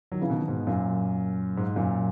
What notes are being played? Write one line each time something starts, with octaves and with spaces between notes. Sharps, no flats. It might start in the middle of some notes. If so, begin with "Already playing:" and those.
D#3 F#3
C#3 E3
B2 D#3
G#2 B2
F#2 A#2
G#2
F#2 A#2